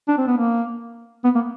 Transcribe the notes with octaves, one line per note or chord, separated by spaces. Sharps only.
D4
C4
B3
A#3
B3
A#3